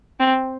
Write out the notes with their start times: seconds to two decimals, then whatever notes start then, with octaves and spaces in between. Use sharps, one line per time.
0.20 C4